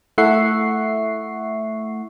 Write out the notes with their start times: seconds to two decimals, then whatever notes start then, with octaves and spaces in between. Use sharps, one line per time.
0.18 A3 E4 E5 F#5 C#6 C7